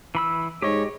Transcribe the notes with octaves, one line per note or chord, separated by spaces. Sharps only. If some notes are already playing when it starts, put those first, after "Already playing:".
E3 B5 E6
G#2 G4 C#5 D#5